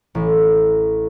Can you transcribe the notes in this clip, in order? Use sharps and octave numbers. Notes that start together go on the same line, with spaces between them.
A1